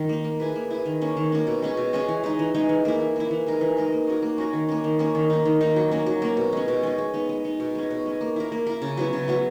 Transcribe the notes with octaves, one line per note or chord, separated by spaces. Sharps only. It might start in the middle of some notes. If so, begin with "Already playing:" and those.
Already playing: D#3
A#3 D#4
A#3
E4 G#4 B4
A#3
E4 G#4 B4
D#3
A#3 C#4
D#3
A#3 C#4
B2
G#3 C#4 G#4
B2
G#3 C#4 G#4
E3
G#3 D#4
E3
G#3 D#4
E3
A#3 E4
E3
A#3 E4
E3
G#3 D#4 A#4
E3
G#3 D#4 A#4
A#3
C#4 F#4 A#4
A#3
C#4 F#4 A#4
D#3
A#3 C#4
D#3
A#3 C#4
D#3
A#3 D#4
D#3
A#3 D#4
F#3
A#3 C#4
F#3
A#3 C#4
B2
G#3 C#4
B2
G#3 C#4
G#3
B3 D#4
G#3
B3 D#4
B2
G#3 C#4
B2
G#3 C#4
A#3
E4 A#4
A#3
E4 A#4
C#3
F#3 B3 E4
C#3
F#3 B3 E4